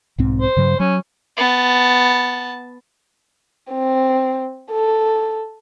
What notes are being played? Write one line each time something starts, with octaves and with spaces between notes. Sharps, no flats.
B1 G#2 C4
C5
G2 C#3 F#3
F#3 C#4
B3 A5
C4
A4